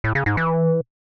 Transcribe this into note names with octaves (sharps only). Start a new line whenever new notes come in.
A2
C#3
G#2
E3